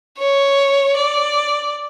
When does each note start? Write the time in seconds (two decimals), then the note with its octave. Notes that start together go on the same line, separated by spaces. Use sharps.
0.18 C#5
0.96 D5